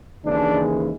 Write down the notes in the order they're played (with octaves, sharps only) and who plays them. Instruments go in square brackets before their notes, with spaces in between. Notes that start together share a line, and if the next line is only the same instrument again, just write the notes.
[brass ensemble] D#2 C#3 E3 G#3 D4